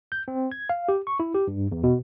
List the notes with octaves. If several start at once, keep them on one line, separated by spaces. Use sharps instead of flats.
G6
C4
G#6
F5
G4
C#6
E4
G4
G2
E2
B2